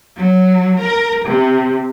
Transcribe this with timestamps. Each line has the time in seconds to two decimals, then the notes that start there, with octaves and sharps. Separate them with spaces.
0.17 F#3
0.80 A#4
1.25 C3